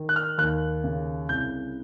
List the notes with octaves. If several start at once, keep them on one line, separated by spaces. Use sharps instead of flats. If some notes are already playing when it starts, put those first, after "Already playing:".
Already playing: D#3
F#6
F6
D#2 F#6
C#3
C2 G6